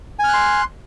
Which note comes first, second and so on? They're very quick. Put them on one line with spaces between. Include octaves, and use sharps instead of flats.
G#5 F6 F#6 C6